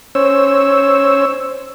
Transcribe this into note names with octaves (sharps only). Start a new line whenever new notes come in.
C#4 C5 C#5 E6